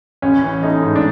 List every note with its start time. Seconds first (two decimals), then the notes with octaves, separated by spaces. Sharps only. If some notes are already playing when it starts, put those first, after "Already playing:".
0.22 A1 C#4
0.42 E3
0.63 A3 D#4
0.82 G#2
0.96 D4